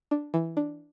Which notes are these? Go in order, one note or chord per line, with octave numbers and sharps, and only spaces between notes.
D4
E3
D4